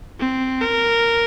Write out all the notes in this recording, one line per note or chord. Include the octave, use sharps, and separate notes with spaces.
C4
A#4